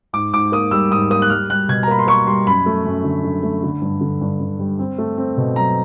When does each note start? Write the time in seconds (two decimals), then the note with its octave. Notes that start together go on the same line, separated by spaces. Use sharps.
0.13 G#2 D6
0.33 G#2 D6
0.52 A#3 D#6
0.71 G3 E6
0.91 G#2 D#6
1.10 A#3 D#6
1.22 F#6
1.30 G3 F6
1.50 G3 F#6
1.69 B2 G#6
1.83 A#5
1.88 A#3 B5
1.99 C6
2.07 A#3 C#6
2.27 G3 C6
2.47 F#2 B5
2.66 A3
2.86 F#2
3.04 D3
3.24 D3
3.43 A3
3.63 D3
3.82 G2
4.01 D3
4.21 G2
4.40 D3
4.59 G3
4.79 C4
4.98 A3
5.17 C4
5.37 B2
5.56 F#3 A#5